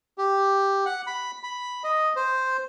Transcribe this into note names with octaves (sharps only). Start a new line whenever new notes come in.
G4
F#5
B5
B5
D#5
C5